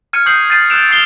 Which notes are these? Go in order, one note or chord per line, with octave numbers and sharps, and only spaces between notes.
F6 G#6 C#7 D#7
C#6 D#6 G6 C7 F#7
G6 A6 C7 D#7
E6 F#6 D7 E7 F7
D#6 C7 F7 G7